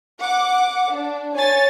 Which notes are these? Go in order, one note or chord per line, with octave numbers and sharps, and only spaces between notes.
F#5 D6
D4
C#5 G#5 A6